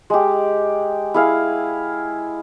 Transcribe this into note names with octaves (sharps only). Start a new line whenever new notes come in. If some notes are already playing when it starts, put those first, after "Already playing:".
G#3 G4
E4 G#4 F5